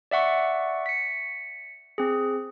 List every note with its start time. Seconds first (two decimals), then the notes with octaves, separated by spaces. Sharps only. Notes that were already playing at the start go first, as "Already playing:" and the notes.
0.11 D5 E5 F#5 C#6
0.86 B6 C#7
1.98 C4 G#4